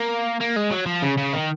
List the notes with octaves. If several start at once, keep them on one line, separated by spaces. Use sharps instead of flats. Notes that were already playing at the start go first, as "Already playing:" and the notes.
Already playing: A#3
A#3
G#3
F#3
F3
C#3
C#3
D#3